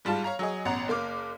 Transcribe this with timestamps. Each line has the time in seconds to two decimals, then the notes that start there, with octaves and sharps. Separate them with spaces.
0.05 G#2 G3 F4 A5
0.24 C#5 F5 A#5
0.39 F#3 G#4 D#5
0.65 A1 B2 F#5 A#5
0.88 F#1 A#3 F5 D6